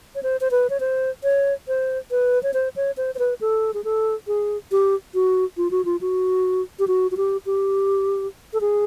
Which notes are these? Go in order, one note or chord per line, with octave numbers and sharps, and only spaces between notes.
C#5
C5
C5
B4
C#5
C5
C#5
C5
B4
C#5
C5
C#5
C5
C5
B4
A4
G#4
A4
G#4
G4
F#4
F4
F#4
F4
F#4
G4
F#4
F#4
G4
G4
A4
G#4